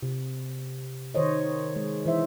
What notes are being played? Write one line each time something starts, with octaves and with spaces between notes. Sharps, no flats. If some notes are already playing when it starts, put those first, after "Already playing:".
C3
D#3 C5 C#5 D#5
G#3
E3 C5 E5